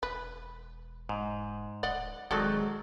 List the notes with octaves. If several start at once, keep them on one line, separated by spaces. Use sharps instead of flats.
E1 B4
G#2
D1 D5 D#5 F#5
D#1 D#3 F#3 G#3 C4 F#4 A4 D5